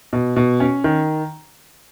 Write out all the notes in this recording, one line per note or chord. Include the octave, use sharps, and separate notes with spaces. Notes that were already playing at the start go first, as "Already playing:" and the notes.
B2
B2
C#4
D#3